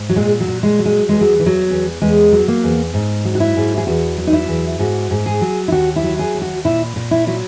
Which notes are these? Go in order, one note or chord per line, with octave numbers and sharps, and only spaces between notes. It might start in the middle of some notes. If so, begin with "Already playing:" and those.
Already playing: G#2
F#3
A#2 G#3
F#3
A#2
G#3
F#3
G#3
E2 G#3
F#3
E3
F#3
E2
E2 G#3
F#3
A#3
E2
G#2
F#3
F#4
E4
G#2
G#4
E2 F#4
F#3
D#4
E4
E2
G#2 F#4
G#2
G#4
F#3
E4
D#2 F#4
E4
F#3
G#4
D#2
F#4
A#2 E4
A#2
E4
F#3 E4